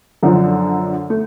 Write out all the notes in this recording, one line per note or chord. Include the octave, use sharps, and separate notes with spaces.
F#2 D3 F3
A3